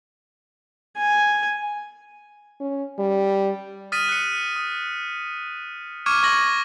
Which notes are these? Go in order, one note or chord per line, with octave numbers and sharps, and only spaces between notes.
G#5
C#4
G3
D#6 F6 A6 B6 D#7
F#6 C#7
D#6
C#6 D6 F6 G#6 C#7 D#7
C#6 G#6 A#6 F#7